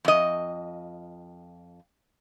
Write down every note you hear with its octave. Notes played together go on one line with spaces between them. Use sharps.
F2 D#5